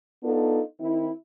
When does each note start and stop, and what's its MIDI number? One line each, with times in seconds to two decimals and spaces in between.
0.23 0.61 59
0.23 0.61 62
0.23 0.61 63
0.23 0.61 65
0.23 0.61 69
0.79 1.10 51
0.79 1.10 60
0.79 1.10 64